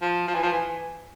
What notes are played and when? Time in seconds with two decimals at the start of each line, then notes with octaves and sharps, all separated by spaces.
0.01 F3
0.28 F3
0.34 E3
0.43 F3
0.52 E3